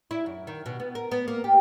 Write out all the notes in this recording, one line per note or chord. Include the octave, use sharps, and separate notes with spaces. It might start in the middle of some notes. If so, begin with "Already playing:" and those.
E4
F#2
D#3
B2
B3
A#4
B3
A#3
G4